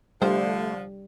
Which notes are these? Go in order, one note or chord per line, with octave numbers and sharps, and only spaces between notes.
D3 F3 G3 A3 F4 C5